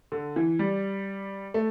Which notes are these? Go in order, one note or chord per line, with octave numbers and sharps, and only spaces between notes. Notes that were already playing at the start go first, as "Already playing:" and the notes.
D3
E3
G3
A3